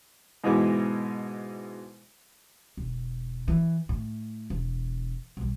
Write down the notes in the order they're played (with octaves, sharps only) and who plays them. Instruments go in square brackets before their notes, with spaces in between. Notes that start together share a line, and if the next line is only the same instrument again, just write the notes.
[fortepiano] G#2 B2 E3 G#3 D6
[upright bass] E1
E3
A2
E1
B1 G3